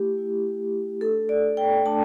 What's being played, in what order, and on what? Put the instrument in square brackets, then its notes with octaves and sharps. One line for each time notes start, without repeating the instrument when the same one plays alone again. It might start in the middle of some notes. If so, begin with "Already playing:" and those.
Already playing: [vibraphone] A3 E4 G4
A3 E4
A3 D4 A4
D5
G5
A3 D4 A5